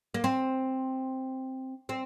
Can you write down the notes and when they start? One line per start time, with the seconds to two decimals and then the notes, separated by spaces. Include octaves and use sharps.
0.14 A#3
0.24 C4
1.89 C4